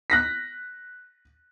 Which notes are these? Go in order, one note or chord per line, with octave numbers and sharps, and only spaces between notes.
F#6 A#6 B6